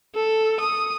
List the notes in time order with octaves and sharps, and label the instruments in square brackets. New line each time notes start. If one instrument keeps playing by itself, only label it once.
[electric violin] A4
D#6